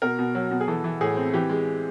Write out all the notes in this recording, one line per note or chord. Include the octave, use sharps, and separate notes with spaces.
B2 A#4
B2
F#3
B2
G#4
E3 A4
E3
A2 G#4
C4
E3 G4
G#3